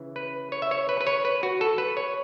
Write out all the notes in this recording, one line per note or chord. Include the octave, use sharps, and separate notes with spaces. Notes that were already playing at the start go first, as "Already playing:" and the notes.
Already playing: C#3 E3
B4
C#5
E5
C#5
B4
B4
C#5
B4
F#4
A4
B4
C#5